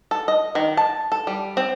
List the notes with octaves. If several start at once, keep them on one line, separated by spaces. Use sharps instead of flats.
A4
D#5
D#3
A5
A4
G3
C4